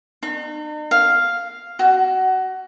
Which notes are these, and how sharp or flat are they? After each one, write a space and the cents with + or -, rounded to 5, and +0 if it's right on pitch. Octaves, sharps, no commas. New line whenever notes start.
D#4 -45
F5 +0
F#4 +20